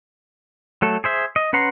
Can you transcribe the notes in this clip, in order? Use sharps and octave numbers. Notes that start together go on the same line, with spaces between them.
F#3 A3 A4
G#4 C5 E5
D#5
C#4 B4 F#5 A#5 C6